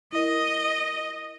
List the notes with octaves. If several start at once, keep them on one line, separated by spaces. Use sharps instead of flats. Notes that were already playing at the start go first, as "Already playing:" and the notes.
E4 A#4 D#5